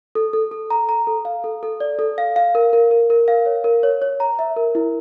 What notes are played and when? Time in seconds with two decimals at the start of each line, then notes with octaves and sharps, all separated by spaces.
0.15 A4
0.33 A4
0.52 A4
0.70 A#5
0.89 A#5
1.07 A4
1.25 F5
1.44 A4
1.63 A4
1.80 D5
1.99 A4
2.18 F5
2.36 F5
2.55 A#4
2.73 A#4
2.91 A#4
3.10 A#4
3.28 F5
3.46 C#5
3.64 A#4
3.83 C#5
4.02 C#5
4.20 A#5
4.39 E5
4.56 A#4
4.75 E4